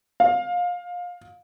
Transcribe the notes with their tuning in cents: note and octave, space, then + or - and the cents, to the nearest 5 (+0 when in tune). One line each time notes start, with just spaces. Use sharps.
F5 +25